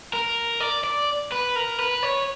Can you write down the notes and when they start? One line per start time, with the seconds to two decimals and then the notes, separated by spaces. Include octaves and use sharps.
0.13 A#4
0.60 D5
0.84 D5
1.32 B4
1.56 A#4
1.79 B4
2.03 C#5